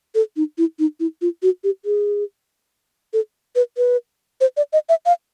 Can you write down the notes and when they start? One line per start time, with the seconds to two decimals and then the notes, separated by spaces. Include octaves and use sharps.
0.15 A4
0.36 D#4
0.58 E4
0.79 D#4
1.00 E4
1.22 F4
1.43 F#4
1.64 G4
1.85 G#4
3.13 A4
3.55 B4
3.77 B4
4.41 C5
4.57 D5
4.73 D#5
4.89 E5
5.06 F5